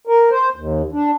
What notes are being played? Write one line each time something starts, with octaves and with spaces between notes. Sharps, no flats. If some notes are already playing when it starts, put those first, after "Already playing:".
A#4
C5
D#2
D4